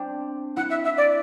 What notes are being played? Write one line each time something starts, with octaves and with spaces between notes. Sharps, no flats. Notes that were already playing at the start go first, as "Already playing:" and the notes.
Already playing: C4 D4
E4 F#5
E5
E5
D5